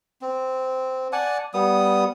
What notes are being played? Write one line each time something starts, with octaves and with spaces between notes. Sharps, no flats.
C4
D5 F#5 G#5 A5
G3 B3 D#6